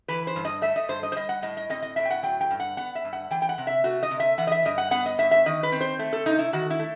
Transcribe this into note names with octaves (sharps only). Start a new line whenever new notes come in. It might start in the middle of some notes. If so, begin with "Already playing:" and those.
E3 B4
C5
G2
D#5
A3 E5
D#5
G2 C5
D#5
C5
G3 D#5
F#5
A2 D#5
D#5
C4 D#5
D#5
A2 E5
G5
F#5
F#3 G5
G5
G2
F#5
B3 F#5
E5
G2
F#5
E3 G5
G5
F#5
C3
E5
A3 F#4
D#5
C3
E5
E3 F#5
D#5
E5
G2 D#5
F#5
B3 F#5
D#5
G2 E5
E5
D#3 D#5
B4
C4
C5
A3
A4
C3 D#4
E4
D#3 F#4
E4
A3